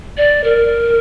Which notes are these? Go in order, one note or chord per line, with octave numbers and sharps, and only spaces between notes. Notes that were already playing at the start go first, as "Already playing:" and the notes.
D5
A#4